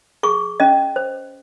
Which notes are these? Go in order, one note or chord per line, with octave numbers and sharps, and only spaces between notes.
G#4 C#6
C#4 D#5
C5